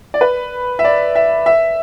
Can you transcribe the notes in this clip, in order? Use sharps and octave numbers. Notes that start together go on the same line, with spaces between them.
D5
B4
E5
D5
E5
E5